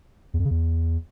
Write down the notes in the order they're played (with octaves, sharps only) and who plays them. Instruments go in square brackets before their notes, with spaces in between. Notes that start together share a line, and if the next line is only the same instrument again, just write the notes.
[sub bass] E2
F2
C#3
E2